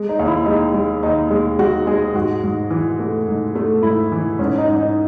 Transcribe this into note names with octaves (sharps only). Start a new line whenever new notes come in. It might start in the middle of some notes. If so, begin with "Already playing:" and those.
Already playing: G#3
D#4
D#2
E4
G#3 D#4
G#3
D#2 D#4
G#3
G#3 F#4
G#3 G#4
G#2 F#4
G#2
E3
A3
G#2
A3
G#2 E4
E3
G#2 C#4
D#4
G#2
D#4